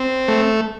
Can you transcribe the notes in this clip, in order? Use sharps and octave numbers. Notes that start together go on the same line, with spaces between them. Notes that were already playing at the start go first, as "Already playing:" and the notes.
Already playing: C4
A3